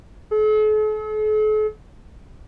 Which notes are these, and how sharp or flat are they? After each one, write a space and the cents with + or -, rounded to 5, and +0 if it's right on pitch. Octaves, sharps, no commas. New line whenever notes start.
A4 -45